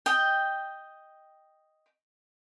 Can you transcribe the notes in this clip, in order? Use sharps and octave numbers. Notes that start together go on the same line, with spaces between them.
D#5 G5